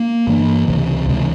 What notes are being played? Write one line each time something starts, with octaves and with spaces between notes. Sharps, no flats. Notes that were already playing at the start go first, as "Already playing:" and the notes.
Already playing: A#3
G2 E3 A#3
C#2 C3 E3
C#2 C3 E3